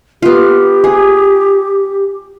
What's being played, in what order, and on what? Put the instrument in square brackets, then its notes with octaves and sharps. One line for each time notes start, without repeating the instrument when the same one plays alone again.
[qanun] B3 F4 [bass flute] G4
[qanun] G#4